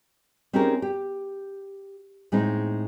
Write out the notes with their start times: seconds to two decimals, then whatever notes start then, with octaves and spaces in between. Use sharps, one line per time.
0.53 C4 C#4 D#4 G4 G#4 A#4
0.82 G4
2.32 A2 G#3 C4 D#4